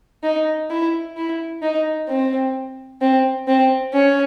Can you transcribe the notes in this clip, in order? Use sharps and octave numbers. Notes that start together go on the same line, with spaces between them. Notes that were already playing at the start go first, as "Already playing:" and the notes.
D#4
E4
E4
D#4
C4
C4
C4
C#4